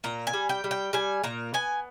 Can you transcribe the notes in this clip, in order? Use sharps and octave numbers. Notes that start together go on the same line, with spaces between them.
A#2 A#5
G#5
G3
G5
G3
G5
G3 G#5
A#2 A#5
B3 G#5